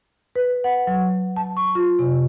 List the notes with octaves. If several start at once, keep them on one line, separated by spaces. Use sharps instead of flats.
B4
F#5
F#3
A5
C#6
F4
C3